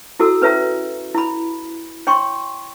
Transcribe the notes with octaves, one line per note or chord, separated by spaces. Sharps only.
E4 F#4 A4 E6
C#4 B4 C#5 E5 A#5
E4 B5
C#5 G5 C6 C#6